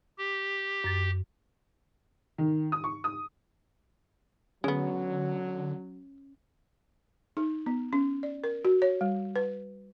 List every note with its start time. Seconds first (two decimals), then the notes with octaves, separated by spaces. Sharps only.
0.18 G4
0.84 F#2 A6
2.38 D#3
2.72 D#6
2.84 C#6
3.04 D#6
4.64 D3 F#3 G#3 B3 C#4
7.37 D#4
7.66 B3
7.93 C#4
8.23 D5
8.44 A#4
8.65 F#4
8.82 C#5
9.01 G3
9.36 B4